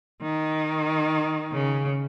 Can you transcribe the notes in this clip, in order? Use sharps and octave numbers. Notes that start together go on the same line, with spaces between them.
D#3
C#3